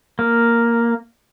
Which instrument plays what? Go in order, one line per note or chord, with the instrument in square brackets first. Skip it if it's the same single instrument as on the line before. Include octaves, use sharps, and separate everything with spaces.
[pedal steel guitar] A#3